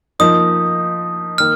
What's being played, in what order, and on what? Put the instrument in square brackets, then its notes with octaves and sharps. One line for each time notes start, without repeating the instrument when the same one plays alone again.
[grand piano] F3 A#3 D#4 [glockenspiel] D#6
[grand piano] D#3 A#3 [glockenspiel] F6